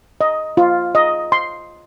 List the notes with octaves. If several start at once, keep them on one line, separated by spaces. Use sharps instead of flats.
D#5
F4
D#5
C6